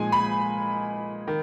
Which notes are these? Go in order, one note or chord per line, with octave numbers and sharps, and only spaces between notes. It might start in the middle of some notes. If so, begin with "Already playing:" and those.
Already playing: A#2 F3 G#3 D#4 G#5
B5
D#3